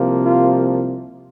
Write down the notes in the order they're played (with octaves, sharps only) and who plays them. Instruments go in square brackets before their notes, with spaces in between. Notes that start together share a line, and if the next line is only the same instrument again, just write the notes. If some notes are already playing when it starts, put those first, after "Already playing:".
Already playing: [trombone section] C2 C3 F3 A#3
F4